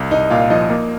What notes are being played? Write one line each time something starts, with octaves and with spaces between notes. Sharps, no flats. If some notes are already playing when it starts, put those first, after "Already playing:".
Already playing: C2
C2 D#4 D#5
A#2 F4 F5
F3 D#4 D#5
A#3